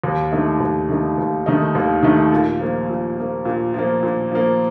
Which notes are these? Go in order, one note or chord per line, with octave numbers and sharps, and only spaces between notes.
D#2
D#3 A3 D#4
D#2
D#3 A3 D#4
D#2
D#3 A3 D#4
D#2
D#3 A3 D#4
A#2
F3 A#3
A#2
F3 A#3
A#2
F3 A#3
A#2
F3 A#3